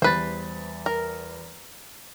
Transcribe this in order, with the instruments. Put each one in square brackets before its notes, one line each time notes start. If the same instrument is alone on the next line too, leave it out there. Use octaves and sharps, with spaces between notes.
[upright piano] E2 G3 A6 [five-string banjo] B4 C5
[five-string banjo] A#4